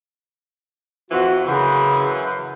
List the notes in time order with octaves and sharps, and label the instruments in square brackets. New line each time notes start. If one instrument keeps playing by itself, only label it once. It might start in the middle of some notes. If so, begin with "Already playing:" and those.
[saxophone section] F2 E3 F3 [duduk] F#4
[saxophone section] F#2 E3 [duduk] C#3